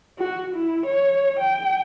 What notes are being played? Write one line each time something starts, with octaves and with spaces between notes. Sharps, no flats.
F#4
E4
C#5
G5